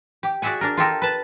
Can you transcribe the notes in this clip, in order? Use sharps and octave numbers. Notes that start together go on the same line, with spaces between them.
G4
F#4 G#4 D5 E5 F#5 G#5
D4 A#4
F4 G4 A4 A#4
B4 A5